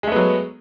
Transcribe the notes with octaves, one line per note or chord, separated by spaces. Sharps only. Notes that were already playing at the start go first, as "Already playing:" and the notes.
F#3 G#3 A3 B3